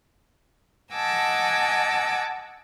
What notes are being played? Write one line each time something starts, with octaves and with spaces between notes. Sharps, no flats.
D#5 F#5 G#5 A5 D6 E6